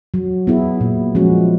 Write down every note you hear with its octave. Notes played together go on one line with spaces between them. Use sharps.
F#3
B3 E4 G#4
A#2
F3 G#3 C#4 F#4